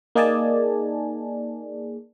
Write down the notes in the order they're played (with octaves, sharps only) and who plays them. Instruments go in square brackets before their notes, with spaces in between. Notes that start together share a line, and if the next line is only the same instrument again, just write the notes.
[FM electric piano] A#3 D#4 G#4 D5 G#5 A5